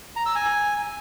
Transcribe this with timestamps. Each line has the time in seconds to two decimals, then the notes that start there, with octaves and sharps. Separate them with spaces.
0.16 A#5
0.26 E6
0.35 G#5